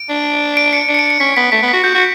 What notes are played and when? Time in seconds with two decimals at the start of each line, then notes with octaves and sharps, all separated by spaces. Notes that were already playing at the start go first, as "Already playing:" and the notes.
Already playing: D7
0.10 D4
0.57 D7
0.73 C#7
0.89 D4 D7
0.94 C#7
0.99 D7
1.10 C#7
1.20 C#4 B6
1.37 B3 B6
1.52 A3 B6
1.63 B3
1.69 F#4 B6
1.84 F#4 G6
1.95 F#4